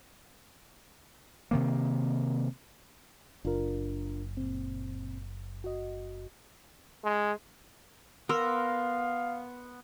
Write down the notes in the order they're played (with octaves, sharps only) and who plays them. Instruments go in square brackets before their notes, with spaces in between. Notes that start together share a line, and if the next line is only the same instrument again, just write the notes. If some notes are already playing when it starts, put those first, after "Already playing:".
[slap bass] C3 D#3 A#3
[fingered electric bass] F#1 [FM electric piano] D4 F4 A#4
[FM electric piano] A#2 C4
F#4 D#5
[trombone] G#3
[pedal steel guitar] B3 C6 E6 [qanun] A#4 [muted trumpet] F5